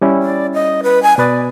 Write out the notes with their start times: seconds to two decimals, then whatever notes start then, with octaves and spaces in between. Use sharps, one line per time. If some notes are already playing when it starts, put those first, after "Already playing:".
0.02 G3 C#4 E4
0.23 D5
0.54 D#5
0.83 B4
1.03 G#5
1.18 B2 B4 D5 D#6